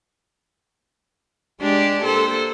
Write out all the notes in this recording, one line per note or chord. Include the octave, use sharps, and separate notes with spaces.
G#3 D4 G4
A#3 A4 C5